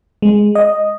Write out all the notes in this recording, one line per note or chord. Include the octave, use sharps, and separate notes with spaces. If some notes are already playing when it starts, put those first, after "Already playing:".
G#3
D#5